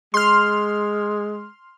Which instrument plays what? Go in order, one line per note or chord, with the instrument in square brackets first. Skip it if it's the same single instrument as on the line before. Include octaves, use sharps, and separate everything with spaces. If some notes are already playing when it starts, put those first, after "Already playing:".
[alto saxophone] G#3 [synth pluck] C6 F6